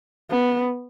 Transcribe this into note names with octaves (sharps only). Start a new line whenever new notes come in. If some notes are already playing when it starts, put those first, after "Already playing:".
B3